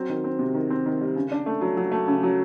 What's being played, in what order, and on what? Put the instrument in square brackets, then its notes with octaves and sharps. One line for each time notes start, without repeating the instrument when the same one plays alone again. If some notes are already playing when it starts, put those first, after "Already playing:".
Already playing: [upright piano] F#3 C4
D#3
C4
C3
D#3
C4
D#3
G3
C#3
D4
A3
F#3
F#3
A3
C#3
F#3